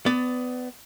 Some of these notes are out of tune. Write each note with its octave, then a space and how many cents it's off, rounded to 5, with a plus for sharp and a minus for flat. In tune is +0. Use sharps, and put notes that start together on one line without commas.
B3 +25 D5 +0